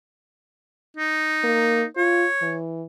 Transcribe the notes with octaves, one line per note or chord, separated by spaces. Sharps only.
D#4
A#3
F4 C#5
E3